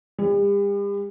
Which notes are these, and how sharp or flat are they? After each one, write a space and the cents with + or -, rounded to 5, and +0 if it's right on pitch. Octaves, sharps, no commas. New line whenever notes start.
G3 +45